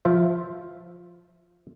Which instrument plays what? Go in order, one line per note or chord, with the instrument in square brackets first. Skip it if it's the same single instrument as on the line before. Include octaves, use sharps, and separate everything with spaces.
[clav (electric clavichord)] F3 F4 C5 E5